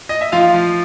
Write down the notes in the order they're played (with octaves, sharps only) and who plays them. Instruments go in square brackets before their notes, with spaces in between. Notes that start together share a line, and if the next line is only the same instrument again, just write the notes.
[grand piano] D#5
E5
F3 F4 F5
F3